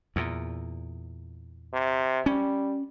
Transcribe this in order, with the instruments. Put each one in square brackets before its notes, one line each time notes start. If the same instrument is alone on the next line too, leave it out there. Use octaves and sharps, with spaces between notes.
[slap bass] E2 A#2
[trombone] C3
[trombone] G3 [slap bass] C#4